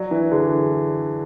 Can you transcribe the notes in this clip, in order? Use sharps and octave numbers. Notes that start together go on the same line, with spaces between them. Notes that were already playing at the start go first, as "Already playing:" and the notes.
Already playing: F#3 D5
E3
D3 G#4